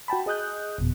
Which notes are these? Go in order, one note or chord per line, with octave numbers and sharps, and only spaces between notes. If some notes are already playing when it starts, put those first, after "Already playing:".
F#4 G5 A5 B5
G#4 D#5 D#6 F#6 G6
G1 F2 B2